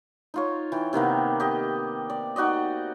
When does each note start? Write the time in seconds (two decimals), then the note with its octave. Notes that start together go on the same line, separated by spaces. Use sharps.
0.34 D#4 F4 C#5
0.72 E3 G5
0.93 C3 D#3 A#3 B3
1.40 G4 D#5
2.10 D5
2.36 D#4 F#4 D5 D#5